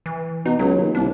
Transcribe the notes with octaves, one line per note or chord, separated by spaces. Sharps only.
E3
B2 D#4
C#2 F#3
D#2
C2 D4